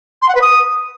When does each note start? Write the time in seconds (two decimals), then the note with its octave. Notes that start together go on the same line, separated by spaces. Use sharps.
0.22 C6
0.28 F#5
0.35 B4
0.41 D#6